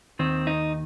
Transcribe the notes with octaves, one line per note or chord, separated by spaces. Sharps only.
D#2 D#3 C4
D#4